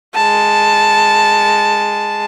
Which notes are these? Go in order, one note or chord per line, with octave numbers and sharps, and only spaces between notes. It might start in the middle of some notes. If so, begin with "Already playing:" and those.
G#3 A5